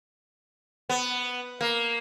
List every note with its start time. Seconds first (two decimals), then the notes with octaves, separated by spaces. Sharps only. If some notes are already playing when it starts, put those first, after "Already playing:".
0.89 B3
1.61 A#3